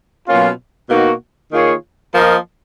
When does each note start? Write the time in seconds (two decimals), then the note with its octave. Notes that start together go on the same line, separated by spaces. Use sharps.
0.27 B2 F#3 A#3 C#4 F4
0.90 B2 A#3 D#4 F#4
1.52 D#3 A#3 F4 G#4 C#5
2.14 F3 A#3 F4 A#4 D#5